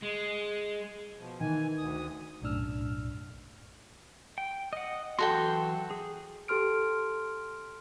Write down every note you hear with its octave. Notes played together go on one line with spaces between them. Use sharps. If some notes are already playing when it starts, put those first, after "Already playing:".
G#3
B2 F3
D#3 E3 G#5
D2 D#6
B1 F#2 A2 D4 E6 F6
G5
D#5 F#5
E3 F#3 F#4 A4 G5 C6
G#4
G4 A4 C6 F6 D7